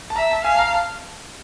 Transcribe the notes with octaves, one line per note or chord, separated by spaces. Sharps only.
A5
E5 A#5
A5
F5 G#5
A5
A#5
A5